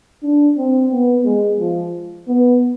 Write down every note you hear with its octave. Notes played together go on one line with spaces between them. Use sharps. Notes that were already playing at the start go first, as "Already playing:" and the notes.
D4
C4
B3
G#3
F3
B3